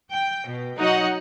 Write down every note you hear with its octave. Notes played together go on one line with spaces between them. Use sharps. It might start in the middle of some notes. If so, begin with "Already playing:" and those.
G5
B2
F#3 D#4 F#4 C#5 D#5 F#5